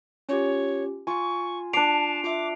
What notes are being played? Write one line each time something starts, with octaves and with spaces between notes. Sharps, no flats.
C#4 F4 G4 C#5
F4 G#5 C#6
D4 A5 D6 C7 D7 F7
F4 E5 D6